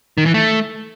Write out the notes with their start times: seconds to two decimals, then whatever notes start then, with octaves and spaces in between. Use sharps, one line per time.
0.18 D#3
0.26 E3
0.34 A3